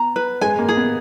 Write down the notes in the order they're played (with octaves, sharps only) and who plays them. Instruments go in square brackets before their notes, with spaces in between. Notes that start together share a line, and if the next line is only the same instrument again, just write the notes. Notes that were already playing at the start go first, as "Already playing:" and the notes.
Already playing: [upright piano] B3 [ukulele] A#5
[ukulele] B4
[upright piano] G#3 [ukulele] G#5
[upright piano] A#3
[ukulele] G#4
[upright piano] B3